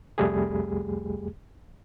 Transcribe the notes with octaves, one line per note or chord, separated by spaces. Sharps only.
C2 F2 G3 A3 G4 G#4